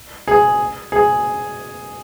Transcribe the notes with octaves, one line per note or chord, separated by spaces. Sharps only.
G#4
G#4